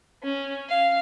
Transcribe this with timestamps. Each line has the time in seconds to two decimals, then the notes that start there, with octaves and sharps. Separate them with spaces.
0.23 C#4
0.69 F5